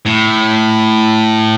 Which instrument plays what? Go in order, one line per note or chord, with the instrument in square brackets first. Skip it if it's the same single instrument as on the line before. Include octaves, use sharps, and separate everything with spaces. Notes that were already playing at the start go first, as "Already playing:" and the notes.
[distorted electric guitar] A2